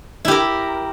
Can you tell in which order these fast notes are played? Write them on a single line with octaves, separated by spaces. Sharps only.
E4 G4 A#4